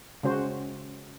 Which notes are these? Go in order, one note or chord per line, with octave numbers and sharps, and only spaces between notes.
C#3 G#3 C#4 F#4 C5